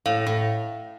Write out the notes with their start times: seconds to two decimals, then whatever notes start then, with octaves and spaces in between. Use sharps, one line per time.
0.06 A2 F5
0.27 A2